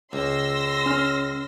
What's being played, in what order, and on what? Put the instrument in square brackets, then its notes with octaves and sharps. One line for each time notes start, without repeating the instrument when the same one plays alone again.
[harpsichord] C#2 [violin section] C6 E6 A#6
[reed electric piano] C#4 F6